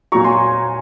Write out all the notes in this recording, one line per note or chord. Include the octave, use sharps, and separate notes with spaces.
A#2 F#3 A#5 C#6
G#5 C6